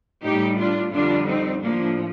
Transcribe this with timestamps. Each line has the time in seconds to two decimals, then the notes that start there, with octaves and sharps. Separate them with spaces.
0.24 A2 G3 D#4 G4
0.58 D4 F4
0.93 F2 D3 G3 D4 F4
1.27 C4 D#4
1.62 A2 F3 A#3 D4